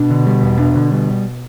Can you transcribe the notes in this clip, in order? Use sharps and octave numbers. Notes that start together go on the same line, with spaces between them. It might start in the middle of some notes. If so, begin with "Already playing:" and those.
Already playing: B2 D4
D3
G3
E2
D4
D3
G3